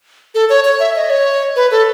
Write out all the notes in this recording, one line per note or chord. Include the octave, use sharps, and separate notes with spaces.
A4
C#5
C#5
E5
D#5
C#5
B4
A4